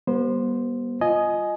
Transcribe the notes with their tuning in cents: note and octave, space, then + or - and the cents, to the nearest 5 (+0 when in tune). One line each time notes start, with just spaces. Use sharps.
G3 +0 B3 -40 C5 +0
F4 +0 D#5 +0 G#5 +20